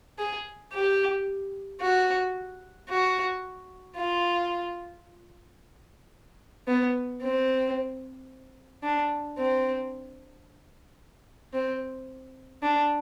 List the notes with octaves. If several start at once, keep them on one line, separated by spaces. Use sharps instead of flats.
G#4
G4
F#4
F#4
F4
B3
C4
D4
C4
C4
D4